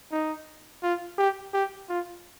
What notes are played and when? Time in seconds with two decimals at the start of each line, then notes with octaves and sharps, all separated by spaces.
0.12 D#4
0.83 F4
1.18 G4
1.53 G4
1.89 F4